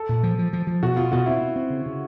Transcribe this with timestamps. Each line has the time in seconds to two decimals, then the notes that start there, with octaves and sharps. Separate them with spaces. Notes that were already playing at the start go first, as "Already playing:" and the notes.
Already playing: A4
0.09 A#2
0.23 F3
0.39 F3
0.53 F3
0.67 F3
0.83 B2 F#4
0.96 B2 F4
1.12 B2 F#4
1.26 C4 E4
1.41 C4
1.56 C4
1.70 C#3
1.86 C#3